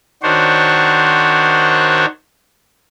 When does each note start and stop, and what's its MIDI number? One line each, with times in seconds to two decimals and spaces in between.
0.23 2.05 51
0.23 2.05 62
0.23 2.05 66
0.23 2.05 72
0.23 2.05 73